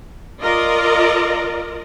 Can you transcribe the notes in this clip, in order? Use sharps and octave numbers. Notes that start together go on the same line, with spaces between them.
F4 A#4 D5 D#5